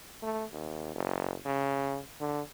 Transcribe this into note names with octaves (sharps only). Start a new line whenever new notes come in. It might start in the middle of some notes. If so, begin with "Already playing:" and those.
A3
D#2
F#1
C#3
D3